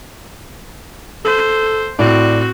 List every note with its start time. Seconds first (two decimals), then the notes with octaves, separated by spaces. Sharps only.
1.25 A4 C5
1.99 A2 C4 F#4 D5